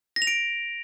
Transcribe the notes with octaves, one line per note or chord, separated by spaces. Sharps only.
A#6
F7
D7